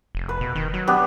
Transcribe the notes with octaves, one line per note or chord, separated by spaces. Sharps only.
F1
B4
B2
D#3
F#3
B3 D4 G4